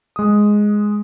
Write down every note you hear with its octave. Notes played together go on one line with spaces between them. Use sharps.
G#3 D#6